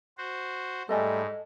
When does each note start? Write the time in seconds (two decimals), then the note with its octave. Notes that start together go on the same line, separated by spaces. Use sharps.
0.18 F#4 C5
0.89 G#2 G3 A3 A4 D#5 G#5